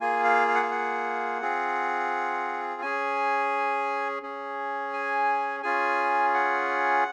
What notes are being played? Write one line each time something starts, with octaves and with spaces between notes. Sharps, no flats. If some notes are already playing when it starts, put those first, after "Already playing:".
A#3 F4 G#4 G#5
F5
F5
F#5
F5
F#5
C4 F4 G#4
C#4 G#4 G#5
C#4 G#4
G#5
C#4 F4 G#4 G#5
F#5